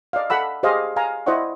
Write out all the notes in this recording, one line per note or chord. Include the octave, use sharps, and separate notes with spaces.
D5 D#5 F5
A4 F#5 B5 E6
G4 G#4 C5 D#5 F5
F5 G#5 A#5
E4 C5 D5 D#5 F#5 C#6